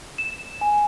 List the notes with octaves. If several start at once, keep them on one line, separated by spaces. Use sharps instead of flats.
E7
G#5